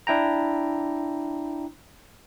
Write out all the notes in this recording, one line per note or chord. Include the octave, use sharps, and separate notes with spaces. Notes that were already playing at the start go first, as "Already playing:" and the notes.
D4 E4 G5 A#5